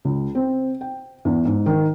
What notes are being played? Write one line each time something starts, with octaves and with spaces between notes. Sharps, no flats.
C#2
C4
G5
E2
G#2
D#3